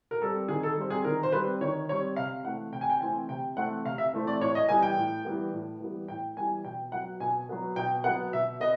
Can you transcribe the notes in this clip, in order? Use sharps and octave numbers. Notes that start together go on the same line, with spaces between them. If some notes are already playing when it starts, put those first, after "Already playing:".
A#4
G3 C4 A4
D#3 G#4
A4
G3 C4
G#4
D#3 A#4
C5
G3 C4 B4
D#3 C#5
G3 C4 C#5
C3 F5
E3 A3 C4 F#5
C3 G5
G#5
G5
E3 A3 C4 G#5
C3 G5
E3 A3 C4 F#5
C3 F5
E5
E3 A3 C4
D5
A2 C#5
D#5
E3 G3 B3 G#5
G5
A2
E3 G3 B3
A2
E3 G3 B3
A2 G5
E3 G3 B3 G#5
B2 G5
F#3 B3 F#5
B2 G#5
F#3 B3
B2 G5
F#3 B3 F#5
B2 E5
B3 D#5